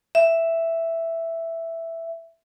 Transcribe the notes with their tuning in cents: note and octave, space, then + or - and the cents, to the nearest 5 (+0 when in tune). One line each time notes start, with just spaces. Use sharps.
E5 +5